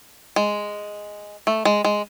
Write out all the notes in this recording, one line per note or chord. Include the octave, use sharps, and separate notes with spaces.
G#3
A3
G#3
G#3